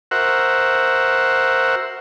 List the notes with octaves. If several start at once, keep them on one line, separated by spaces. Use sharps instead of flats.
F#4 A#4 C5 E5 F#5